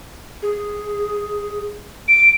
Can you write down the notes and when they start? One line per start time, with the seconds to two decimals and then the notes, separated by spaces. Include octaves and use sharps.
0.42 G#4
2.08 D7